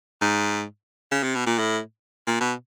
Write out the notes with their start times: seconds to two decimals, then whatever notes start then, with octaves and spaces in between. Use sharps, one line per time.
0.21 G#2
1.11 C#3
1.23 C3
1.35 B2
1.46 A#2
1.59 A2
2.27 A#2
2.40 B2